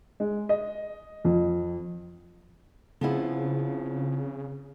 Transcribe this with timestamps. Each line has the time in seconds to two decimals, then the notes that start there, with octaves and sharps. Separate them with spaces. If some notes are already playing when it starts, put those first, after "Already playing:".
0.20 G#3
0.49 D#5
1.25 F2
3.01 C#3 F3 B3 C4 E4 G#4